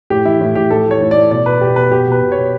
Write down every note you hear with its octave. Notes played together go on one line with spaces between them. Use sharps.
A2 G4
E3 E4
A2
A2 G4
A2 A4
E3
C#5
A2
A2 D5
B2 D5
B2 B4
B2 G4
B2 B4
B2 G4
B2 B4
B2
C#5
B2